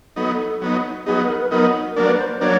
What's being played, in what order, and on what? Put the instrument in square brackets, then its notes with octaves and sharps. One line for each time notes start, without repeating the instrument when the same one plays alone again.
[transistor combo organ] F#3 B3 D#4 [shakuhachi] A4
[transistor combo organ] F#3 B3 D#4
[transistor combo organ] F#3 B3 D#4 [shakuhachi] G#4
[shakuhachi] B4
A#4
B4
[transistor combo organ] F#3 B3 D#4 [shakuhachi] A#4
[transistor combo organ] F#3 A#3 D4 [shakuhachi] A#4
[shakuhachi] B4
C5
[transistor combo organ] F#3 A#3 D4 [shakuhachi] C#5